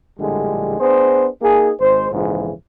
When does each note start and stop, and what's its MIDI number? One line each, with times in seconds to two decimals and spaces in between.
0.19 0.78 34
0.19 0.78 45
0.19 0.78 50
0.19 0.78 55
0.19 0.78 56
0.80 1.28 59
0.80 1.28 62
0.80 1.28 68
0.80 1.28 72
1.42 1.72 58
1.42 1.72 63
1.42 1.72 68
1.80 2.10 32
1.80 2.10 56
1.80 2.10 72
2.12 2.52 34
2.12 2.52 41
2.12 2.52 44
2.12 2.52 49
2.12 2.52 52